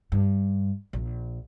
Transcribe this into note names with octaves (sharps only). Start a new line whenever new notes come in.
G2
A#1